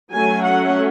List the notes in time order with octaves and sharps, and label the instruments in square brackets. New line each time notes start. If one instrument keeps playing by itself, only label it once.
[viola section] F#3 A3 C#4 G#5
F#5